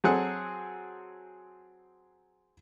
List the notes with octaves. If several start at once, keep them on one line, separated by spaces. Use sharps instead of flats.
F#3 C4 G#4 A4 F#5